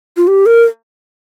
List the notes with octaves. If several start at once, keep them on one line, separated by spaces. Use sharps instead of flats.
F4
G4
A#4